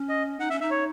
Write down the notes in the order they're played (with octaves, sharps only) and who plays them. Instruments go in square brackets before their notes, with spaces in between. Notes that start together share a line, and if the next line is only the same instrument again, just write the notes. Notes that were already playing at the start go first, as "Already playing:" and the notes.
Already playing: [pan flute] C#4
[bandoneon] D#5
[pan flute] D#4 [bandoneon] F#5
[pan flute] C#4 [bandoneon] E5
[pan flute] D#4 [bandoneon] E5
[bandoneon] C#5